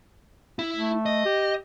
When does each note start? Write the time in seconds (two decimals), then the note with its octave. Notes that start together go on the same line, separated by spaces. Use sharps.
0.59 E4
0.76 A3
1.06 D#5
1.25 G4